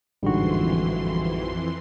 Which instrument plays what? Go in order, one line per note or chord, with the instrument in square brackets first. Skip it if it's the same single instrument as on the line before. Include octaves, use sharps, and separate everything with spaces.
[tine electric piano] A1 F#4 [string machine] F2 E3 C6 [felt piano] G#2 D3 G3